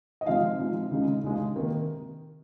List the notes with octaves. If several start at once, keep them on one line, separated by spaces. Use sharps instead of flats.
D#5
C3 F3 G#3 D#4 F5
C3 F3 G#3 D#4
C#2 C#3 G#3 D#4
C#2 C#3 G#3 D#4
C3 D#3 A#3 D#4